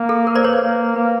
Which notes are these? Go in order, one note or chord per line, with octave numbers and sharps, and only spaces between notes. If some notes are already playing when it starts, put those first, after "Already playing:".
Already playing: A#3
A4
A#4
C5 D5
B4 C#5
C5
A#3
A#3 B4